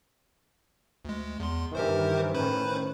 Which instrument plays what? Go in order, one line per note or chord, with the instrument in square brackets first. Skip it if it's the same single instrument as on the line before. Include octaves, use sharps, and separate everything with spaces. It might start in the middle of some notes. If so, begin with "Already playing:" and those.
[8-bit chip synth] D2 G#3
E2 C6
[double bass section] G2 D#3 E3 [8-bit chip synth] G4 A#4 C5
[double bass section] A2 D#3 C#4 [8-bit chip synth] B4 C5 B5